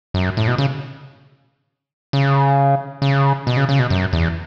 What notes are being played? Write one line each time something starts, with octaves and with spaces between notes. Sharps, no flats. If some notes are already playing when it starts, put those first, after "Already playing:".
F#2
A2
B2
C#3
C#3
C#3
B2
C#3
C#3
B2
F#2
E2